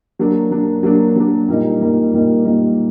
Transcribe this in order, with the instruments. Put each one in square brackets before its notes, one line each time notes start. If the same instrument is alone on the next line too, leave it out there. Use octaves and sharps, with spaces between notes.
[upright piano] F#3 A#3 D4
F#3 A#3 D4
F#3 A#3 D4
F#3 A#3 D4
A#2 G3 A#3 D#4
A#2 G3 A#3 D#4
A#2 G3 A#3 D#4
A#2 G3 A#3 D#4